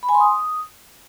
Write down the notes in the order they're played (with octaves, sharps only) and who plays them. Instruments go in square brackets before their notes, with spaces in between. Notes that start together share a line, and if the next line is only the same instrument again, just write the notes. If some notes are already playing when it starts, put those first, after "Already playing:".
[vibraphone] B5
G#5
C6
D#6